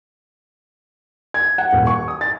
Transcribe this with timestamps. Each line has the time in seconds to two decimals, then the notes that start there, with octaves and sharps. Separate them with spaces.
1.34 G#6
1.58 F#5
1.72 D#1
1.87 C#6
2.08 D#6
2.21 A6